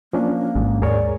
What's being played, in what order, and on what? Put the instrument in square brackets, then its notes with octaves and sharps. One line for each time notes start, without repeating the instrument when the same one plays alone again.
[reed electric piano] F3 C#4 D4 [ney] A#3
[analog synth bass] A1 [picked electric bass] G#2
[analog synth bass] D#2 [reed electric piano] G#4 A#4 C#5 [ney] D5